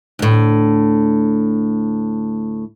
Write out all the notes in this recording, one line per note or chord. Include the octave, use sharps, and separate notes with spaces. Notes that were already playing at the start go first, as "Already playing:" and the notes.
D2 A2